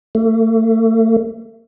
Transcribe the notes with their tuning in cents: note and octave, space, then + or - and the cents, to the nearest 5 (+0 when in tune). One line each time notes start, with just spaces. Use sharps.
A3 +35